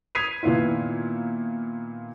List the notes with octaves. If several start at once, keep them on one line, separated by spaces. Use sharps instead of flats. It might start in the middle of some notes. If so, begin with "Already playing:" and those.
D#6 G#6 B6 C7 D#7 F7
A#2 D#3 B3 E4 F4